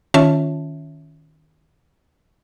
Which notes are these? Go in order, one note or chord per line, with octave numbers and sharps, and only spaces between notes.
D#3 C#4 F4 C#5 E5 A5